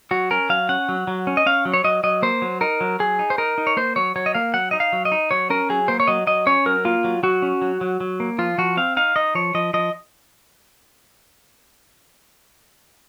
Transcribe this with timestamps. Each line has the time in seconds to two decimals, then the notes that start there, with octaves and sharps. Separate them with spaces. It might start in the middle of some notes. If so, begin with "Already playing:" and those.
0.11 F#3 F#4
0.30 C#4 A#4
0.49 F#3 F5
0.69 C#4 F#5
0.89 F#3
1.07 F#3
1.27 C#4
1.37 D#5
1.46 C#4 F5
1.65 F#3
1.74 C#5
1.84 F#3 D#5
2.03 F#3 D#5
2.22 A#3 C5
2.42 F#3
2.61 D#4 A#4
2.81 F#3
3.00 F#3 G#4
3.19 D#4
3.30 C5
3.38 D#4 A#4
3.58 D#4
3.67 C#5
3.77 A#3 C5
3.96 F#3 C#5
4.16 F#3 C#5
4.26 D#5
4.35 A#3 F5
4.54 F#3 F#5
4.71 D#4 D#5
4.80 F5
4.93 F#3
5.05 D#5
5.12 D#4
5.31 F#3 C#5
5.50 C#4 A#4
5.69 F#3 G#4
5.88 A#3 C5
6.00 C#5
6.07 F#3 D#5
6.27 F#3 D#5
6.46 C#4 C#5
6.66 F#3 A#4
6.85 A#3 F4
7.04 F#3
7.23 F#3 F#4
7.42 C#4
7.62 F#3
7.81 F#3
8.00 F#3
8.20 A#3
8.38 F3 F4
8.58 F3 F#4
8.77 C4 F5
8.97 D#4 F5
9.16 D#4 D#5
9.35 F3 C#5
9.54 F3 D#5
9.74 F3 D#5